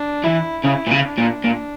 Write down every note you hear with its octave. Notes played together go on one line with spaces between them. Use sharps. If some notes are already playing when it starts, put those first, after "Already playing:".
Already playing: D4
E3 E4
C#3 E4
A#2
C#3
D4
A#2
A#2